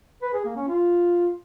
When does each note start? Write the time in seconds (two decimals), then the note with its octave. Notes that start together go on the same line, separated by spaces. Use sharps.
0.22 B4
0.34 G#4
0.45 A#3
0.56 C#4
0.68 F4